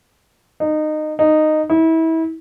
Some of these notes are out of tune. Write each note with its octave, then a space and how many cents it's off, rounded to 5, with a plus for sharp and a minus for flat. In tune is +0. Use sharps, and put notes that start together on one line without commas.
D#4 -20
D#4 -10
E4 -30